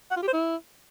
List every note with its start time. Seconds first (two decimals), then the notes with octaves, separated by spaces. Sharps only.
0.11 F#5
0.17 F4
0.22 G4
0.28 C5
0.33 E4